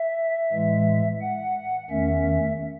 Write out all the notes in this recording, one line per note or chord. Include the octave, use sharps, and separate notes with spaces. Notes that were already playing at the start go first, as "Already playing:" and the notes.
Already playing: E5
A2 E3 G#3
F#5
E2 D#3 A3 C#4 E5